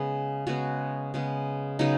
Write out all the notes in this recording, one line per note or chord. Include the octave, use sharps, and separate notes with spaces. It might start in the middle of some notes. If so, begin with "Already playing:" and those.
Already playing: C#3 G#3 B3 G#4
C#3 G#3 B3 F#4
C#3 G#3 B3
C#3 F#3 B3 D#4